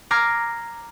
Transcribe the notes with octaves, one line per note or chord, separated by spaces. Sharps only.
A#5 D6 F6 G#6 C7